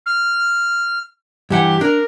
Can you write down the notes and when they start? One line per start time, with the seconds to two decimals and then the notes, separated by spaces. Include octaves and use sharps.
0.06 F6
1.50 G2 E3 G4 F#5
1.81 D4 A#4